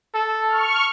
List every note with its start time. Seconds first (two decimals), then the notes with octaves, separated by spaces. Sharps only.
0.14 A4
0.48 C#6 F6